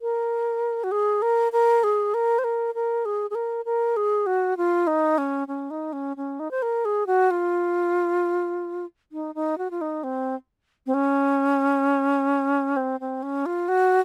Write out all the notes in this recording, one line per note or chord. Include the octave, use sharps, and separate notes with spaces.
A#4
F#4
G#4
A#4
A#4
G#4
A#4
C5
A#4
A#4
G#4
G#4
A#4
A#4
G#4
F#4
F4
D#4
C#4
C#4
D#4
C#4
C#4
D#4
C5
A#4
G#4
F#4
F4
D#4
D#4
F#4
F4
D#4
C4
C4
C#4
C4
C4
C#4
F4
F#4